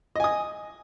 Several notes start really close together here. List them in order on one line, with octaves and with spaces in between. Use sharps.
D#5 G#5 D#6